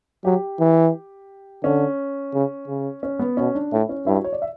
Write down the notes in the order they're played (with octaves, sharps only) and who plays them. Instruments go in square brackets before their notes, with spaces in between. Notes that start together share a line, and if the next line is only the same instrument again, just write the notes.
[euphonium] F#3 [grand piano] G4
[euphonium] E3
[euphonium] D3 [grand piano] C#4
[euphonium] C#3
C#3
[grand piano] C#4
B3
[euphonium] B2 [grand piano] C#4
[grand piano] D4
[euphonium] A2 [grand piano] E4
[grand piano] C#4
[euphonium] G2 [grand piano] E4
[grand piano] F#4
C#5
D5
E5